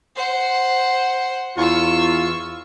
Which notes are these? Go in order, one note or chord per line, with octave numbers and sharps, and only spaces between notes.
C5 F#5
E2 F4 C#6 E6